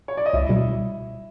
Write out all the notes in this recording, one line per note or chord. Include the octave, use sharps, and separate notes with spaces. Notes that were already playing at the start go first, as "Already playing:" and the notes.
C#5
D5
D#5
C#2 E4 E5
B2 G3